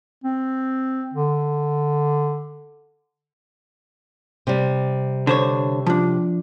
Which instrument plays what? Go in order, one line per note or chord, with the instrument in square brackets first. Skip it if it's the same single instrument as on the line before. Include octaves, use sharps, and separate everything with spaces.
[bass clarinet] C4
D3
[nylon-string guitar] C3 G3
[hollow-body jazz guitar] D3 C5 C#5
F3 D4